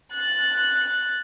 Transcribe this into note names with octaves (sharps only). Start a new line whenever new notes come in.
F#6 A6